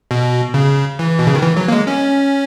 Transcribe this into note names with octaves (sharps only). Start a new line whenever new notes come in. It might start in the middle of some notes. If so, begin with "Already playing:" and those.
B2
C#3
E3
B2
C#3
D#3
E3
F#3
A#3
G#3
C#4